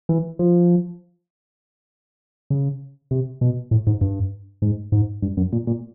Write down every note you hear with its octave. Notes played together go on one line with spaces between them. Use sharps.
E3
F3
C#3
C3
B2
A2
G#2
G2
G#2
G#2
G2
F#2
A#2
A#2